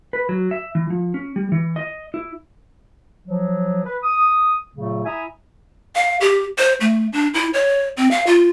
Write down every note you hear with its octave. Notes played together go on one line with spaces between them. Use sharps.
B4
F#3
E5
E3
F3
C#4
G3
E3
D#5
E4
F3 F#3
B4
D#6
A#2 C#3 F#3 A3
E4 E5 G#5 A#5 D#6
F5
G4
C5
A3
D4
E4
C#5
C4
F5
F4